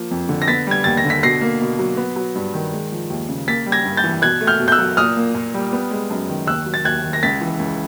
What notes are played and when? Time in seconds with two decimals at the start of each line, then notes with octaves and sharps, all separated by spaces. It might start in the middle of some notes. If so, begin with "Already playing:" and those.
Already playing: F3 A#3
0.11 F2
0.29 D3
0.42 A#6
0.48 B3 A6 B6
0.67 G3 G#6
0.84 D#2 A6
0.97 A#6
1.05 D3
1.10 B6
1.23 B2 A#6 C7
1.41 A#3
1.61 B2
1.79 F#3
1.97 B3
2.16 F#3
2.35 G2
2.54 D#3
2.73 G#3
2.92 F3
3.10 D#2
3.29 C#3
3.47 A#3 A6 B6
3.66 G3
3.72 G#6 A#6
3.85 G2
3.97 G6 A6
4.04 E3
4.22 B2 F#6 G#6
4.41 A3
4.47 F6 G6
4.60 B2
4.68 G6
4.72 E6 F#6
4.78 F#3
4.97 A#2 D#6 F6
5.17 A#3
5.35 A#2
5.54 G3
5.73 B3
5.91 G#3
6.10 F#2
6.29 D#3
6.47 D#2 E6 F#6
6.66 F#3
6.74 A6
6.84 D#2 F#6 G#6
7.04 D#3
7.13 A#6
7.23 C#2 A6 B6
7.41 E3
7.59 C#2